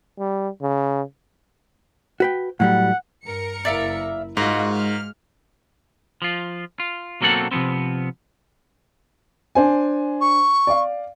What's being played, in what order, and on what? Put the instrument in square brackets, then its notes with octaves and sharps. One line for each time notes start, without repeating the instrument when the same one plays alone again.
[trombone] G3
C#3
[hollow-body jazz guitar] F#4 B4 G5
[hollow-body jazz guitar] A2 F#3 G3 [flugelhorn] F#5
[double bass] G2 [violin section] A#4 C#7
[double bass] F#1 E4 [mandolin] D5 E5 F5
[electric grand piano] G#2 [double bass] G#3 [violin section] F4 F#4 D#5 [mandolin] A#4
[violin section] F6
[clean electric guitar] F3 F4
F4
B1 F#3 A#3 C4 A4 F#5
C3 F3 A3 B3 C4
[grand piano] D4 C5 G#5
[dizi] C#6
[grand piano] D5 F5